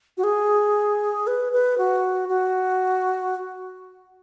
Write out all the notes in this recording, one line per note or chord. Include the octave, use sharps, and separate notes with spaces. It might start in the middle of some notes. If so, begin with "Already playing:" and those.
F#4
G#4
B4
B4
F#4
F#4